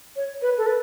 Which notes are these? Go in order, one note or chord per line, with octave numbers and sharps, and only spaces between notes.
C#5
B4
A4
B4